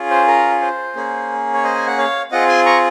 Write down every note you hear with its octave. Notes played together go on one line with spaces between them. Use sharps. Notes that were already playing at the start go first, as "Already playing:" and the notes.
Already playing: C#4 F4 G#4
C5
A#4
C5
A#3 C#4 G#4
C#5
C5 D#5
G#5
F#5
C#5 F5
C4 F4 G#4 D#5 F#5
G#5 C6
A#5 C#6